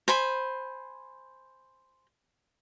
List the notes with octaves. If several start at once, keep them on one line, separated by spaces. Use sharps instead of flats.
C5 G#5 B5